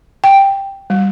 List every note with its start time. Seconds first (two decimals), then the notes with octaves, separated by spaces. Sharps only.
0.24 G5
0.90 G3